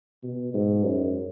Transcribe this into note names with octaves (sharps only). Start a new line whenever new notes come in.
B2
G#2
F#2